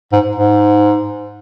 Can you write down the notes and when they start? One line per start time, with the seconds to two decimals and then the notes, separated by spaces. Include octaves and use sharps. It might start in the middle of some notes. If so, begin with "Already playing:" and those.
0.12 G#2
0.35 G#2